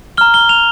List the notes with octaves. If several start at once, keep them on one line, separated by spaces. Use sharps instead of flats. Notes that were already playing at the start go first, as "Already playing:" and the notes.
A#5 F6 G7
G7
F7